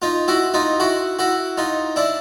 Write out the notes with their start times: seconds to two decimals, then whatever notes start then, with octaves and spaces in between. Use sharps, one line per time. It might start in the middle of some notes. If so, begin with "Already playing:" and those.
0.02 D#4 F4
0.28 E4 F#4
0.54 D#4 F4
0.80 E4 F#4
1.19 E4 F#4
1.57 D#4 F4
1.96 D4 E4